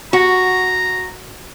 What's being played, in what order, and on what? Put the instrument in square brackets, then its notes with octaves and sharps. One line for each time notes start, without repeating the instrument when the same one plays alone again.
[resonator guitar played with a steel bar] F#4 [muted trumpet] A#5